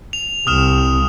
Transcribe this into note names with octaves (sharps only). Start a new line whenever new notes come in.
F7
C2 D#6 F6 E7